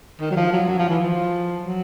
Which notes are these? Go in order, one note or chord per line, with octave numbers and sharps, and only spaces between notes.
D#3
F#3
F3
F#3
F#3
F3
E3
F3
F#3